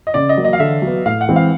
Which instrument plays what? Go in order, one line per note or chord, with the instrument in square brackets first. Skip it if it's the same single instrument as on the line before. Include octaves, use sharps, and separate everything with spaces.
[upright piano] D#5
[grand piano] C#3 [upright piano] D5
[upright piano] D#5
[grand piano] F#3 A#3
[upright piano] D#5
F5
[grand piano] D3 [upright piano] E5
[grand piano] F#3
B3
[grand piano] A2 [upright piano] F5
[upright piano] F#5
[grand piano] E3 G#3 C4
[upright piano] F5